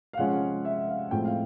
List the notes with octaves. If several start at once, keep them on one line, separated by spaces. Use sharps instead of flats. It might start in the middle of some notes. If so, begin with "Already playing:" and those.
F5
C3 F3 G#3 C#4 F#5
E5
F5
A2 F3 G#3 C4 G5
F5